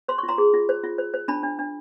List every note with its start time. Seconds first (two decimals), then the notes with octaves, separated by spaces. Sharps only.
0.08 C5 C6
0.18 C#6
0.23 F4
0.28 A#5 C6
0.38 G#4
0.53 F4
0.69 C5
0.84 F4
0.98 C5
1.14 C5
1.28 D4 A5 B5
1.43 D4
1.59 D4